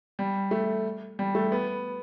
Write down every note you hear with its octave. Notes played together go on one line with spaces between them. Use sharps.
G3
A3
G3
A3
B3